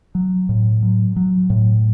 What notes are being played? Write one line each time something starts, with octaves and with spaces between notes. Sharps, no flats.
F#3
A2
F#3
F#3
A2